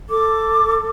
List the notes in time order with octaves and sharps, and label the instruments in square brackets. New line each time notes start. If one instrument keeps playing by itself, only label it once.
[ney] A4 [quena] D6